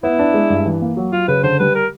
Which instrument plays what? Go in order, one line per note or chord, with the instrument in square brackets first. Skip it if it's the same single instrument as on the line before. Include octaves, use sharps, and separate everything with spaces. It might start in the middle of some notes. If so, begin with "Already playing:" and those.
[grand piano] B3 [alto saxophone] E4
[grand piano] D4
G#3
G2
E3
A#3
F#3
[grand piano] F#3 [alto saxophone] F4
[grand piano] C#3 [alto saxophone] B4
[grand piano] D3 [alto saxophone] C5
[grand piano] G3 [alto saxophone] B4
[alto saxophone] A#4